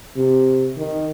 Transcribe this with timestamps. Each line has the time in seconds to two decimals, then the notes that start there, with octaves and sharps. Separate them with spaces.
0.16 C3
0.77 D#3